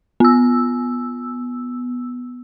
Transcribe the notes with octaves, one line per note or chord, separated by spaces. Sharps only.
B3 E6